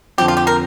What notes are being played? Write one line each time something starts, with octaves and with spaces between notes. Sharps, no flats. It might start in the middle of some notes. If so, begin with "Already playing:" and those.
F2 D3 F3 C4 G4
F4
G4
A#4